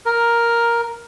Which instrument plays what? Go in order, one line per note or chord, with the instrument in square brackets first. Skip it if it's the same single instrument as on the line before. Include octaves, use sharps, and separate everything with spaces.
[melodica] A#4